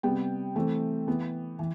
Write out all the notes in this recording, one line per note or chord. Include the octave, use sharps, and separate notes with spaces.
C3 G3 B3 G5
E3 A3 C4
E3 B3
E3